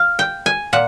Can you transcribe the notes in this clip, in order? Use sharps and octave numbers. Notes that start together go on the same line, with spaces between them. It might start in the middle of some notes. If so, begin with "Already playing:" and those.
Already playing: F5
G5
G#5
A#2 F#5